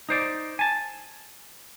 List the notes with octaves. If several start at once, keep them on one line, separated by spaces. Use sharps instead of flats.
D#4 C5 D5
G#5 A5